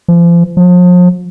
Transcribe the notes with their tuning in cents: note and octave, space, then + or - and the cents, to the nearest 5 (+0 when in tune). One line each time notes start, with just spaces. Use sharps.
F3 -35
F3 +40